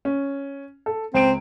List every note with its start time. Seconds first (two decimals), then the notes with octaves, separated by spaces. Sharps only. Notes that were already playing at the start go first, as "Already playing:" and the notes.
0.05 C#4
0.86 A4
1.14 C#2 C4 D7